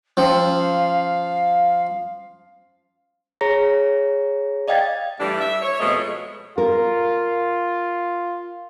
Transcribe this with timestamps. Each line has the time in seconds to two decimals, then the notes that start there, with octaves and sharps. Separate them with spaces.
0.17 F3 C#4 F5 G5 E6
3.41 G#4 C#5 A#5 A#6
4.68 D5 D#5 F5 G5 G#6 A6
5.20 G2 E3 G3 A3 D4
5.40 E5
5.62 C#5
5.80 F2 B2 G#3 A3 D#5
6.58 F4 A#4